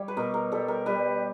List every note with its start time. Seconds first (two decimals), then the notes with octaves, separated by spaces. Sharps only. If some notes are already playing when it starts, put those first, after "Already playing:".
Already playing: G3 C#5
0.08 B4
0.17 B2 A#4
0.34 A#4
0.52 G3 A4
0.68 A#4
0.86 G3 B4